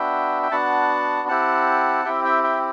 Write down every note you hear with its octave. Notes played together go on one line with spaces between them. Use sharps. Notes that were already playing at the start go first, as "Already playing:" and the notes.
Already playing: B3 D4 F#4 E5 G5
G5
B3 D4 F#4 F#5 A5
C4 E4 G4 F#5 A5
C4 E4 G4 E5 G5
E5 G5
E5 G5